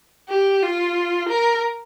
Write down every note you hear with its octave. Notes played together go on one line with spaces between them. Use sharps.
G4
F4
A#4